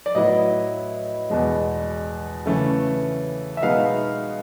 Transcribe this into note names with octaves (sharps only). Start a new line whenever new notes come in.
D5
A2 F#3 B3 E4 D#5
E2 B2 G#3
C#3 E3 A3 C#4
E5
B2 G#3 B3 D#4 F5